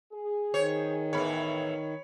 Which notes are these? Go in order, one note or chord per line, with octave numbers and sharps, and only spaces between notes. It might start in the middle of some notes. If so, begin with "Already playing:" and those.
G#4
D#3 C5 C#5
E2 A2 E3 C#5 B5